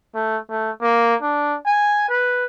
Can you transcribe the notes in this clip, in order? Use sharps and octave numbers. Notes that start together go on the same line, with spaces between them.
A3
A3
A#3
D4
G#5
B4